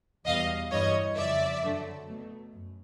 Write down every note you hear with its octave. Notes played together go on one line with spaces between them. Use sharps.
E2 B2 G3 D#5 F5
G2 E3 G3 C#5 D#5
F2 C#3 F3 D5 E5
F#2 D3 F#3 A3
B2 F#3 A3
F#2